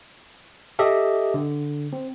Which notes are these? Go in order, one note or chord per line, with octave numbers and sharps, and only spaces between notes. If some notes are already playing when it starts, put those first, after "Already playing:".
G4 A4 D#5 E5
D3
C4